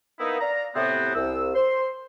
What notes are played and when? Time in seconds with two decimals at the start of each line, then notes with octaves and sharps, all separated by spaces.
0.19 A#3 B3 D#4 E4
0.40 D5 F5 A#5
0.75 A2 C3 B3 C4
1.15 C2 E6
1.55 C5 C6